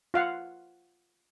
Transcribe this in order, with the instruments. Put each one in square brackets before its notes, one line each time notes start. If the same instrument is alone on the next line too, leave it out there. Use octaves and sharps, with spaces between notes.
[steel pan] F4 F5 F#5